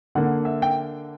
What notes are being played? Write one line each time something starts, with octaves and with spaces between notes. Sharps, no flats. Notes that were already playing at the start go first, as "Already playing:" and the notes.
D3 A#3 F#5
E5
G5